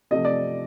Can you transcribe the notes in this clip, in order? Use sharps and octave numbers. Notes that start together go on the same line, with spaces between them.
C3 F3 A3 C4 D#5
D5